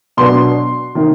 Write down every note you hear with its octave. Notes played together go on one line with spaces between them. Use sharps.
B2 F#3 B3 D4 C6
C3 D#3